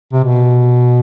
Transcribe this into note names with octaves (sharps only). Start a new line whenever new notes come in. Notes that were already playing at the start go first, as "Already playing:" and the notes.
C3
B2